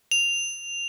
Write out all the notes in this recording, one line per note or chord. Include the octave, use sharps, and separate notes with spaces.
F7